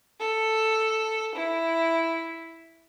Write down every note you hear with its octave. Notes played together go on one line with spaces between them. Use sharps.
A4
E4